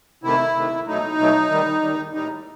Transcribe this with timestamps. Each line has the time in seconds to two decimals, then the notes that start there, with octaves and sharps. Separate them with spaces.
0.24 C3 D#3 A3 E4
0.55 C3 D#3 A3
0.87 B2 F#3 A3 D#4
1.18 B2 F#3 A3
1.50 D#3 G3
1.81 D#3 G3
2.14 A2 G3 D#4